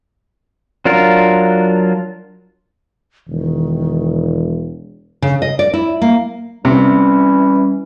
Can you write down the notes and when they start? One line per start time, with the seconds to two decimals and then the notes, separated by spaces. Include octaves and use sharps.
0.85 F#3 D4 F4 A#4
3.28 E1 D#3
5.22 C#3
5.42 D#5
5.59 D5
5.74 E4
6.02 A#3
6.65 C3 E3 G3 C#4